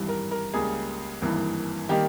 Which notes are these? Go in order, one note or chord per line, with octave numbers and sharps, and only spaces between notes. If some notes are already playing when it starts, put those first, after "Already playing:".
Already playing: G#1 G2 E3 G3
A#4
A#4
C#2 C#3 G3 A#3 G#4
G#1 G2 E3 A#3
D#3 G3 A#3 G4